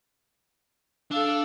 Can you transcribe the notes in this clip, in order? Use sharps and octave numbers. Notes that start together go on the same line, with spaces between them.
D4 A4 F5 E6